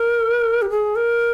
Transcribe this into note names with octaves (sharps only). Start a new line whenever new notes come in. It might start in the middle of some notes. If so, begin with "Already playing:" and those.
Already playing: A#4
G4
G#4
A#4